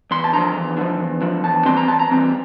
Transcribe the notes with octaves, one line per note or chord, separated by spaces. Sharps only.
E2 C6
A5
D3 F3 A#5
E2
D3 F3
E2
D3 F3
E2 A5
E3 G3 C4 C6
A#5
E2 A5
A#5
E3 G3 C4